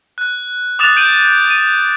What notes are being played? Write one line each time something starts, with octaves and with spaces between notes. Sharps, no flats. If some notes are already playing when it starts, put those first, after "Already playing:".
F#6
D6 D#6 F#6 A6 E7 F7
G6 D7 D#7 F#7
D#7